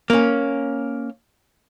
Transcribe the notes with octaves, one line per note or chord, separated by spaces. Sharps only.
A#3 C#4